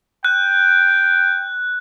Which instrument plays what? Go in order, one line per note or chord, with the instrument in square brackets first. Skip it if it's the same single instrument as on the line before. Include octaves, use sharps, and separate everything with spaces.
[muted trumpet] G5 [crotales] F#6